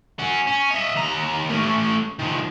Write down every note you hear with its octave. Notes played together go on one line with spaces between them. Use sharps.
C#4 F#4
C#4
D#5 E5
D#2 A#5
A3 C#4
D#3 F3